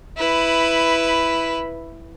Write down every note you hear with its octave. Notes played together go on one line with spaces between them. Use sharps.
E4 B4